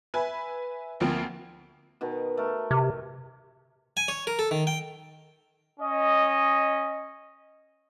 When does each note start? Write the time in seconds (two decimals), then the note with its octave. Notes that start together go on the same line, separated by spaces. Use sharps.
0.14 B4 E5 G#5
1.00 D2 F3 A#3 C4
2.01 B2 D#3
2.37 A3 A#4
2.71 C3
3.97 G#5
4.08 C#5
4.27 A#4
4.39 A4
4.51 D#3
4.67 G5
5.80 C#4 D#5